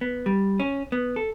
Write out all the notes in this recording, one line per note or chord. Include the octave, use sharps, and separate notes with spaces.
B3
G3
C#4
B3
A4